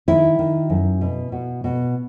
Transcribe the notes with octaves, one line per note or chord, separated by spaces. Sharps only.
D#3 E4
D#3
F#2
B2
B2
B2